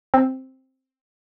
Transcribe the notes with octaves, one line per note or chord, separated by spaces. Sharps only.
C4